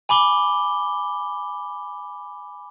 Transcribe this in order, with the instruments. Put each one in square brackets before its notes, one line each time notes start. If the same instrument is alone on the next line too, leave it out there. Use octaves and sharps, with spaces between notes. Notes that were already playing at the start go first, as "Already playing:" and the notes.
[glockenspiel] G#5 B5 D6 G7